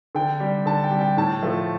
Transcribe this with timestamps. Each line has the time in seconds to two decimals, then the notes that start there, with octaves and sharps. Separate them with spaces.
0.15 D3 G5
0.40 G3
0.66 D3 A5
0.84 G5
0.91 G3
1.00 G5
1.17 A2 A5
1.43 F3 A3